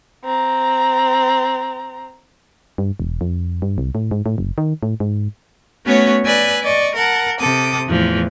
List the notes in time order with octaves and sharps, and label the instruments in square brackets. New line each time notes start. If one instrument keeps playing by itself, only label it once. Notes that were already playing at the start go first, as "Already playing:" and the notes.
[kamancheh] C4 A#5
[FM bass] G2
E1
F2
G2
C2
A2
G#2
A2
F#1
D#3
A2
G#2
[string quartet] A3 B3 C#4 F#4 C#5
B4 D5 G#5 E6 F#6
D5 D#5 C#6
A#4 F#5 A5
C3 A4 D6 D#6
E2 A2 E3 F3